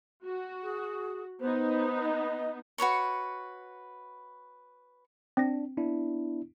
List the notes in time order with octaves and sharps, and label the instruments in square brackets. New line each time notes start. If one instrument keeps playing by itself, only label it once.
[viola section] F#4
[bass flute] G#4
[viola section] B3 D#4 [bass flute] C5
[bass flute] D#5
[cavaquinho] F#4 B4 C#5 C#6
[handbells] C4 A#6 [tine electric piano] D4
[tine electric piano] B3 D4 E4